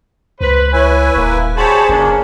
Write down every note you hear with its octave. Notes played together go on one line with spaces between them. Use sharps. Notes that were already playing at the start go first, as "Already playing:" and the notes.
C#2 B4 C5
E4 B4 C#5 G#5
D#1 A#3
G2 F#4 G#4 C5 C#5 A5 B5
F#1 F3 A#3 C#4 D4